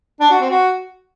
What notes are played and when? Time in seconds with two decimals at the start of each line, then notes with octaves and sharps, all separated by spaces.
0.20 D4
0.31 F#4
0.41 C4
0.51 F#4